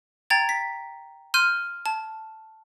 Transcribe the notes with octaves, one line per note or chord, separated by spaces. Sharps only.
G5 A#5 G#6 A6
B6
C6 F6 G6 D#7
A5